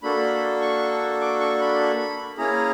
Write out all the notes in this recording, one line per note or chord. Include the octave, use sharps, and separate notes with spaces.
A#3 D4 F#4 A4 B5
C#6
D6
C#6
B5
A#3 C#4 E4 G#4 A#5